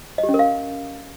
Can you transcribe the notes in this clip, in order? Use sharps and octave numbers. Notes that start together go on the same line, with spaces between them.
D#5
G4
C#4
A#4
F5